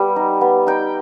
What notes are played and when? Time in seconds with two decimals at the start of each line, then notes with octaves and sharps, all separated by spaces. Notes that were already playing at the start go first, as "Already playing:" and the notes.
Already playing: G3 B3
0.16 D#4
0.41 B3
0.67 D#4 G5